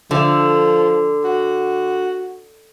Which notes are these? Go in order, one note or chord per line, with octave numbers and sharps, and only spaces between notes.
D3 F3
F#4